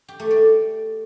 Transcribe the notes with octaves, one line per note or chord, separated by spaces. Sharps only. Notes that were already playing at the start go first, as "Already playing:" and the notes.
G4
A3
D5